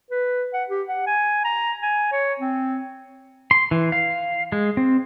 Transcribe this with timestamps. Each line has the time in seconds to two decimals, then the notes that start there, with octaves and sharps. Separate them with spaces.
0.11 B4
0.54 F#5
0.69 G4
0.88 F#5
1.07 G#5
1.44 A#5
1.83 G#5
2.12 C#5
2.40 C4
3.51 C6
3.71 E3
3.92 F5
4.52 G#3
4.77 C4